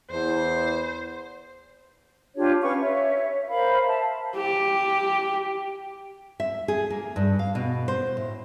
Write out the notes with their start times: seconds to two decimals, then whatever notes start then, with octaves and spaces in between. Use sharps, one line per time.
0.11 E2 C5
2.36 D4 F4 G4 C#5
2.62 C#4 B4 F5 C#6
2.80 C#5 E5
3.49 A#4 C5 F5 B5
3.88 E5 A5
4.36 G4
6.40 E5
6.68 G#4
6.90 A#3
7.16 G2
7.39 F5
7.55 B2
7.88 C5
8.17 A2